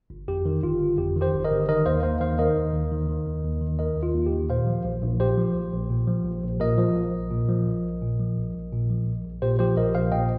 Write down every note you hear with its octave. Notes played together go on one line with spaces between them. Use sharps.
G1
F2 G4
D#3
G1 F4
G1
F2 G4
D#3
G4 C5
G1
A#4 D#5
G1
D#3 A#4 D#5
D#2 C5 F5
D#2 C5 F5
D#3 C5 F5
D#3 A#4 D#5
D#2
D#2
D#3
D#3
D#2
D#2
D#3
D#3 A#4 D#5
D#2
F4
D#2
G4
D#3
A#2 C5 F5
F3
A#1
A#1
A#2 G4 C5
F3
A#1
A#1
A#2
F3
A#1
A#1
A#2 A#4 D#5
F3
A#1
A#1
A#2
F3
A#1
A#1
A#2
F3
A#1
A#1
A#2
F3
A#1
A#1
A#2 G4 C5
F3 G4 C5
A#1 A#4 D#5
A#1 C5 F5
A#2 D#5 G5